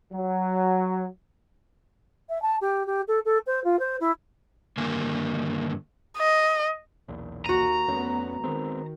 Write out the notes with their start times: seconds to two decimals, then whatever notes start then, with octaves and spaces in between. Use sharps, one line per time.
0.13 F#3
2.29 E5
2.42 A5
2.61 G4
2.86 G4
3.07 A4
3.25 A4
3.46 C5
3.64 F4
3.79 C5
4.00 E4
4.77 G2 D3 D#3 A#3 A#4 G#5
6.18 D#5
7.08 B1 E2 A#2
7.46 D#2 F#4 A#5 D#7
7.88 F2 A3 B3 C#4
8.43 D#3 G#3 B3 C4